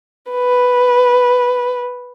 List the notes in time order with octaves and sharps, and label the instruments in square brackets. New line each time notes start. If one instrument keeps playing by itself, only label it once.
[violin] B4